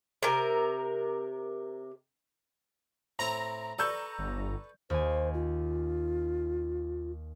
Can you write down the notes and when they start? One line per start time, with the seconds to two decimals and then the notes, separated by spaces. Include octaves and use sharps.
0.23 C3 A#4
3.19 A2 C4 E4 A#5
3.79 A4 B4 D5 C#6 E6 G6
4.19 G1
4.90 D#2 C5 G#5
5.34 F4